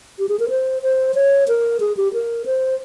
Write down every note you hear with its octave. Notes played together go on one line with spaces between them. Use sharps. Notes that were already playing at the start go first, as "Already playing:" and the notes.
G4
G#4
A#4
C5
C5
C#5
A#4
G#4
G4
A#4
C5